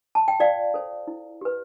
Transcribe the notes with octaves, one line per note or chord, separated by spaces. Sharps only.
A5
G5
F4 D5 F5
A4 C5
E4
G4 B4